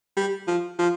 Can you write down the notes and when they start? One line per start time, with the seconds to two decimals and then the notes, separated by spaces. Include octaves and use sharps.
0.17 G3
0.47 F3
0.79 F3